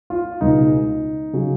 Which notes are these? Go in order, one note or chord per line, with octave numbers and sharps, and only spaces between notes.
F4
C#2 B2 G#3 D#4
C#3 F#3